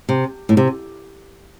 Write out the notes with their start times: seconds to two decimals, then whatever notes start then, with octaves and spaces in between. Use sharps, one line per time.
0.09 C3
0.49 A2
0.57 C3